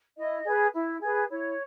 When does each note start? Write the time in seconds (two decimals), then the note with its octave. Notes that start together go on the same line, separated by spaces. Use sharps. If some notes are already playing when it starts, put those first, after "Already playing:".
0.17 E4 D#5
0.45 G#4 B4
0.73 E4
1.02 G#4 B4
1.29 E4 C#5